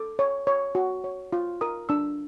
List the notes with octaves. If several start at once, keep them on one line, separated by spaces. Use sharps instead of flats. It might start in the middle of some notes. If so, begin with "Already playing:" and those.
Already playing: A4 D6
C#5
C#5
F#4
C#5
F4
A#4 D#6
D4 E6